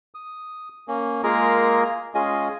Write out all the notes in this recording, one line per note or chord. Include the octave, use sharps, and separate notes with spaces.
D#6
A#3 C#4
G#3 A#3 F4 G#4 A#4
G#3 C#4 F4 G#4 D#5